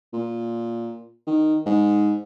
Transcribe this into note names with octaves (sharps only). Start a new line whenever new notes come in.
A#2
D#3
G#2